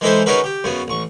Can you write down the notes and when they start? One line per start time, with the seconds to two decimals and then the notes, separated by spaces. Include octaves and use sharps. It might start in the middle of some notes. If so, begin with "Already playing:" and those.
0.01 E3 G#3 D#4 A4 B4 C5
0.26 C#3 C#4 D#4 F#4 A#4 B4
0.44 G4
0.64 F#2 C#3 B3
0.88 A1 C#6